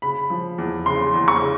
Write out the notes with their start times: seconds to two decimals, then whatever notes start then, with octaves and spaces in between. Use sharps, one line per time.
0.02 C#3 B5
0.30 F3
0.58 E2
0.86 C#3 C6
1.14 E2
1.28 C#6
1.42 C#3